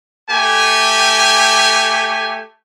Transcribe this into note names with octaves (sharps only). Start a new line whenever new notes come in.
A3 G4 G#5